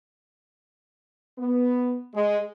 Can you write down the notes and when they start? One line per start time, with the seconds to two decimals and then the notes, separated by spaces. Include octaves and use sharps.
1.38 B3
2.15 G#3